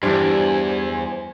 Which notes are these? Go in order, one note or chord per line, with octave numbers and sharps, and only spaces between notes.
E2 G2 E3 G3 D4 C5 D5 G#5